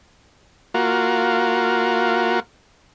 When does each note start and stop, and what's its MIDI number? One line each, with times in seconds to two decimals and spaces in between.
0.74 2.40 58
0.74 2.40 65
0.74 2.40 66